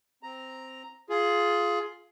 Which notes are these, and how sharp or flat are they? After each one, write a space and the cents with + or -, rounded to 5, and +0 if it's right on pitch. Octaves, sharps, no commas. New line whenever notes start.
C4 +0 A#5 +0
F4 +0 G#4 +15